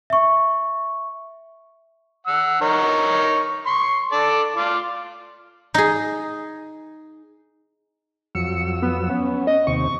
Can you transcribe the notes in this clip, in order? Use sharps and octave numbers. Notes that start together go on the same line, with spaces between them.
E5 C#6
F#5 E6
D#4 A#4 C#5
C6 C#6
A4 D5 A5
F4 D5
D#4 G#4
F2 F#3 E6 C#7
B3
B3 C#4
D#5
D#2 C3 C#6